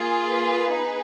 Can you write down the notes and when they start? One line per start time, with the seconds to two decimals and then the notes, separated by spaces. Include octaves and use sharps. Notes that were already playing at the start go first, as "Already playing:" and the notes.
Already playing: A#3 F4 G#4
0.29 B4
0.71 B3 D#4 G#4